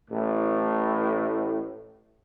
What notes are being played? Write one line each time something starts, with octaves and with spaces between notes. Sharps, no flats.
A1 A2